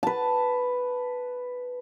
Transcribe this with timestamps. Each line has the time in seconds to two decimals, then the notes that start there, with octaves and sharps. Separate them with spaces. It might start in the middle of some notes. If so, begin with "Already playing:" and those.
0.03 B4 A5